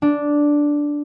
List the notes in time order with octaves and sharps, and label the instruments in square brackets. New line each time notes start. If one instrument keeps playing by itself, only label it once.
[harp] D4